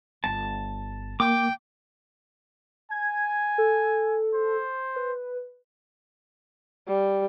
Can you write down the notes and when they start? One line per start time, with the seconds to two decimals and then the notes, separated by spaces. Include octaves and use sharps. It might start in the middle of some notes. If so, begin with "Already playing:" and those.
0.24 G1 A5
1.20 A#3 G5 D6
2.91 G#5 G#6
3.58 A4
4.34 C5
4.96 B4
6.88 G3